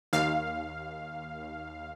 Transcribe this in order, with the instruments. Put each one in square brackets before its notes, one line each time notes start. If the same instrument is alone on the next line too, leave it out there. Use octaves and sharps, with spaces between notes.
[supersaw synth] D#2 F5